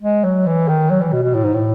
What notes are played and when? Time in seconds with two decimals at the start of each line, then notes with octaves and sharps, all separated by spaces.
0.02 G#3
0.24 F#3
0.46 E3
0.68 D#3
0.90 F#3
1.01 E3
1.12 B2
1.24 B2
1.34 A2
1.44 G#2
1.54 A2